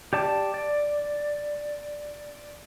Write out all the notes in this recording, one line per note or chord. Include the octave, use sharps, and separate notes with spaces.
G4 D5 A5 D6
D5